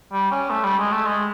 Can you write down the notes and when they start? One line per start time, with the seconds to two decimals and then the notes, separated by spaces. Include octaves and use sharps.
0.12 G3
0.31 C#4
0.50 A3
0.64 G3
0.79 G#3
0.92 A3
1.06 G#3